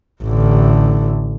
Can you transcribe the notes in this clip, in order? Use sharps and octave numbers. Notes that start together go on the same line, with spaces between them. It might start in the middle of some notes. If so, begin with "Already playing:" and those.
A1 D3